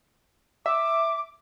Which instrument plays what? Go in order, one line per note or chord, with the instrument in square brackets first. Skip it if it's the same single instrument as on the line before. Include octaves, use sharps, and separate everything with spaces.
[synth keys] E5 [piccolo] D6